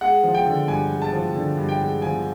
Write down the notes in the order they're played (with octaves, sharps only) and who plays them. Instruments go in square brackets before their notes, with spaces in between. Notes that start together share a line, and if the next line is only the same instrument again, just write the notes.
[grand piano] G#3 F#5
F3
G5
D3
G2 G#5
G#3
A5
F3
D3
G2
G5
G#3
F3 G#5